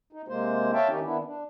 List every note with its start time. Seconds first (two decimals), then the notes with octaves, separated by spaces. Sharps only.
0.13 D#4
0.28 C3 G#3 A#3 C5
0.73 C#5 E5 F5 G5 A5
0.89 D#3 C#4 D#4 G4
1.03 D#3 B3 D4 E4
1.25 D4